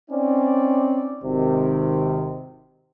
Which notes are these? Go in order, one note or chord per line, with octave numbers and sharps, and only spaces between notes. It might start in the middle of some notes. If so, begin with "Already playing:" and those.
C4 C#4 D#4 D5
G#1 C3 D#3